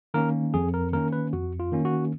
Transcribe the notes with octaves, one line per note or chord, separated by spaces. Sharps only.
D#3 A#3 C#4 A#4
F2 G#4
A#4
D#3 A#3 C#4 A#4
B4
F2 F#4
F4
D#3 A#3 C#4
F#4